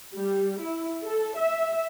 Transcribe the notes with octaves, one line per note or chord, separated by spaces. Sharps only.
G3
E4
A4
E5